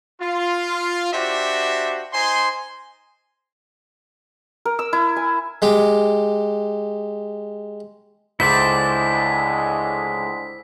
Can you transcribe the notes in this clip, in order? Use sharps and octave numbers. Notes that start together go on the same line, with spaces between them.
F4
D4 F#4 G4 C5 E5
D#4 C5 G#5 C6
A#4
E6
E4
G#5
G#3 G4
C#2 A2 D3 G#3 E4 C5 D5 B6